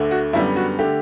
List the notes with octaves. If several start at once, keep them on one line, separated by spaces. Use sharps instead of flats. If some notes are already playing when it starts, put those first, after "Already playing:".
Already playing: D2 D3 A3
F#4
F#2 D3 G3 B3 E4
F#4
D3 A3 G4